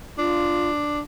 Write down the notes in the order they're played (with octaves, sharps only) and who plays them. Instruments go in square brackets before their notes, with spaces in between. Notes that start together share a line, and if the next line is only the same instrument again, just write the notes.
[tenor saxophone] D4 [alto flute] F4